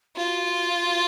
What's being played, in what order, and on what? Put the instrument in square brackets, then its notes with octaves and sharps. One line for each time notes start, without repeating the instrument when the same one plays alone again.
[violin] F4 [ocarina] F#4